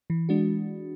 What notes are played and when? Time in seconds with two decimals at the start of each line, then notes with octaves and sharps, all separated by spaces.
0.10 E3
0.29 G#3 D4 F#4